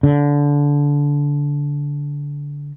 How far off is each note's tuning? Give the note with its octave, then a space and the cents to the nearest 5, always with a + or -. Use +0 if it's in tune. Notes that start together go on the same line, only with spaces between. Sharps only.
D3 -20